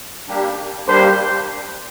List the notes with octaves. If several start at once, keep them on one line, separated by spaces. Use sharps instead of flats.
G3 A#3 D4 G4
G3 A#3 D4 G4 C5